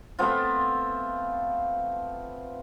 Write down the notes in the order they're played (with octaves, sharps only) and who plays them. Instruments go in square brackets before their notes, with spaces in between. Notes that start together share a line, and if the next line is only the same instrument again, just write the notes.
[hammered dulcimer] A3 B3 C4 F4